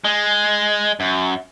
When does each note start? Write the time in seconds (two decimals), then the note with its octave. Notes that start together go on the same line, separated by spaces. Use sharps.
0.04 G#3
1.00 F#2